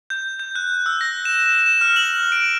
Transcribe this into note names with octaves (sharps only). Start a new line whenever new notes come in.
G6
G6
F#6
E6
A#6
E7
E7
E7
F6
F#7
D7